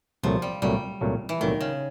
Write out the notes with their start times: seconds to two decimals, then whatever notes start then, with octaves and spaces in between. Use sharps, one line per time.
0.23 C2 A#2 F3 F#3 A3
0.42 G3
0.62 C2 A#2 F#3 G3 A3
1.01 C2 A#2 F#3 A3
1.29 E3
1.40 C2 A#2 D#3 F#3 A3
1.61 C#3